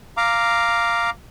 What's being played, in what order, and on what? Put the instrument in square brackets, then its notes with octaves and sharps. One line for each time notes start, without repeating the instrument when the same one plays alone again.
[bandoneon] F5 A#5 D6